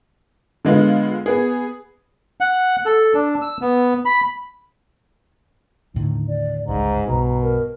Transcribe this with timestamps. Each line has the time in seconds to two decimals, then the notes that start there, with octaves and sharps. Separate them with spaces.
0.65 D3 G#3 B3 F4
1.26 B3 G#4
2.41 F#5
2.86 A4
3.14 D4
3.42 E6
3.61 B3
4.05 B5
5.94 D#2 A2 D3 D#4
6.27 D5
6.68 G1 C#2 G#2 A#5
7.08 B1 G2 B2
7.42 A#4